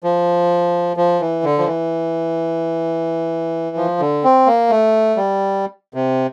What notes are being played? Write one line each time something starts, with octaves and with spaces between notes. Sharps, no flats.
F3
F3
E3
D3
F3
E3
F3
D3
C4
A#3
A3
G3
C3